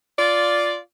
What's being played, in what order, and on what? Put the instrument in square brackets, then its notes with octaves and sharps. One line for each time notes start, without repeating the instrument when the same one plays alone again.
[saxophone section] F4 D5